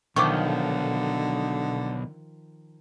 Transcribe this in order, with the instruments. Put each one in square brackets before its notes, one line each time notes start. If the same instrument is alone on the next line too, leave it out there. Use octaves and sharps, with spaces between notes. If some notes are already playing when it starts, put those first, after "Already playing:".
[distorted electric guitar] B1 [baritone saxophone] D3 [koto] D#3 F3 [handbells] C#6 D6